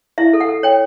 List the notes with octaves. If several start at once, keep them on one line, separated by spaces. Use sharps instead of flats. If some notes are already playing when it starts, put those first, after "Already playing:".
E4 E5
A4
F#5
A4
C#5 G5